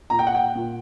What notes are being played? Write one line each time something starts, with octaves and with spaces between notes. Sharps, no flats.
A#2 A#5
G5
F#5
G5
A#2